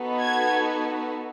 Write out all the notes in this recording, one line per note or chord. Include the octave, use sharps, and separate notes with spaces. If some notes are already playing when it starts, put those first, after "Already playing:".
Already playing: B3 D#4 F#4 A4
G#6